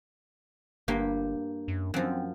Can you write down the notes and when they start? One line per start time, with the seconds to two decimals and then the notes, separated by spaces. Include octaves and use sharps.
0.88 G1 G2 A#3 G4
1.68 F#2
1.94 F#2 F3 C4